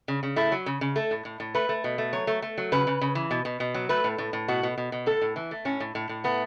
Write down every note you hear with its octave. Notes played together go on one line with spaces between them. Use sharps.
C#3
C#3
A3 E4
F#3
C#3
C#3
A3 A4
A2
A2
A2
A3 B4
A3
B2
A3
F#3 C#5
A3
A3
F#3
C#3 B4
C#3
C#3
E3
B2
B2
B2
F#3
A3 B4
A2
A2
A2
B2 F#4
B2
B2
B2
A2 A4
A2
E3
A3
A2 C#4
A2
A2
A2
A3 B3